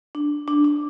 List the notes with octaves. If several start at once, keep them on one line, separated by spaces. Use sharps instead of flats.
D4
D4
D4